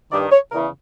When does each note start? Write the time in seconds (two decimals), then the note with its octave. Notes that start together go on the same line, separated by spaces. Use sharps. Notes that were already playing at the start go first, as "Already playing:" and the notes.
0.12 G2 D#3 D5
0.32 C#5
0.52 E2 C#3 E3 A#4